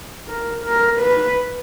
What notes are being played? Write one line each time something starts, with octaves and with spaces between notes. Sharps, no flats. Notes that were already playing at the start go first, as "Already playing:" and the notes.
A#4
A#4
B4